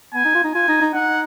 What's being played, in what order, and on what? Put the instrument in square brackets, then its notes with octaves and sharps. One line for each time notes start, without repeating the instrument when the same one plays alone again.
[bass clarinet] B3 [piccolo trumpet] G#5
[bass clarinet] D#4
F4
D#4
[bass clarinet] F4 [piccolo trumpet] G#5
[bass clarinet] D#4
D#4
[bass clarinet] D#4 [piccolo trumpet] F#5